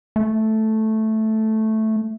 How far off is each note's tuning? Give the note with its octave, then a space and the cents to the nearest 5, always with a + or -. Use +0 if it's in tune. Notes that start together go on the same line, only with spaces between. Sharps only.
A3 -5